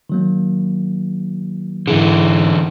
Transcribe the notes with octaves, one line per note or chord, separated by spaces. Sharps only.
D#3 F#3 A#3
G#2 D3 E3 E4 G#4